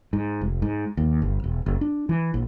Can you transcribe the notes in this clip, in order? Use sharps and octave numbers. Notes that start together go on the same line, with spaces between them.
G#2
F1
G#2
D#2
G1
E1
F#1
D4
E3
A#1